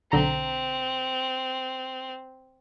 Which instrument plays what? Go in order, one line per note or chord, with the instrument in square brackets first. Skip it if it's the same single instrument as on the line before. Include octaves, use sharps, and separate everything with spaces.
[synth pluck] B1 D3 A#5 [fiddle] C4